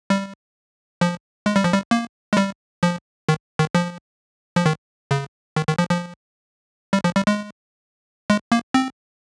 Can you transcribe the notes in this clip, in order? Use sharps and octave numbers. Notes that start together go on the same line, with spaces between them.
G3
F3
G#3
G3
F3
G3
A#3
G#3
G3
F3
D#3
D#3
F3
F3
D#3
C#3
D#3
D#3
F3
F3
G3
F3
G3
G#3
G#3
A#3
C4